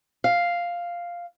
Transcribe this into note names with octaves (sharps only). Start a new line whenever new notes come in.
F5